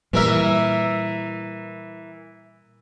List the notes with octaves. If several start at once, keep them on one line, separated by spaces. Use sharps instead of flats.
A#2 E3 G3 A#4 E5